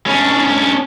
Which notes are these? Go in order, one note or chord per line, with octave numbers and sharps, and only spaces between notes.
C#4 D4